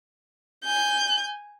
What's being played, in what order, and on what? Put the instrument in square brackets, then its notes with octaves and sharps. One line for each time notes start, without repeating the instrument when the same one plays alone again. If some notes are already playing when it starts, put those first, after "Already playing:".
[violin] G#5 G6